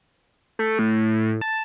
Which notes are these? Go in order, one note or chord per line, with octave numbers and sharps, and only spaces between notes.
A3
A2
A5